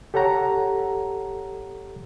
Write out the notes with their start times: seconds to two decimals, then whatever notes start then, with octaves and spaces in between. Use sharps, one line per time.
0.14 G4 A4 C#5 F#5 A#5